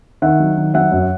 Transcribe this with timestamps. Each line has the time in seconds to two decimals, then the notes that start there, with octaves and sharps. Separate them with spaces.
0.22 D#3 E5 F#5
0.40 F#3
0.57 D#3
0.74 F#3 E5 F#5
0.92 F#2